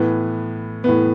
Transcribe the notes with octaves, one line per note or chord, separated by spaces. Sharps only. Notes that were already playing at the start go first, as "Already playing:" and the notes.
Already playing: A2 E3 B3
A2 E3 B3